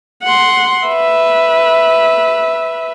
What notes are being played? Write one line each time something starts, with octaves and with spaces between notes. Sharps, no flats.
F#5 C6
B4 E5